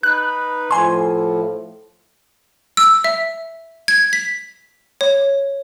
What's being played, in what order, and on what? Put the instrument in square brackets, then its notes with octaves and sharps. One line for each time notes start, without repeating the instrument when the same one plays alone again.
[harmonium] D#4 B4 [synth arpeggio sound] F#6
[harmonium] A2 F3 [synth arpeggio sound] G#5 C6
[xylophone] E6
E5
G#6
B6
C#5